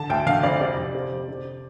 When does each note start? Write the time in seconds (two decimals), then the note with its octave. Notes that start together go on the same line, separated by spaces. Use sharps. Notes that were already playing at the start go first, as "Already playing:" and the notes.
Already playing: D3 A5
0.10 D2 G5
0.26 D3 F5
0.43 F2 D5
0.60 C3 D5
0.77 F2
0.95 C3
1.12 F2
1.28 C3